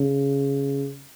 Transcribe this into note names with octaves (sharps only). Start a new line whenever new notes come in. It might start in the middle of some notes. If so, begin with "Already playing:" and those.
Already playing: C#3